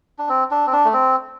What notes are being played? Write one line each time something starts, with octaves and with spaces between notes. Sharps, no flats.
D4
C4
D4
C4
D4
A3
C4